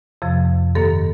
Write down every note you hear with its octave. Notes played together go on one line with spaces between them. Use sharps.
F2 C3 F3
G2 D#3 A#3 A4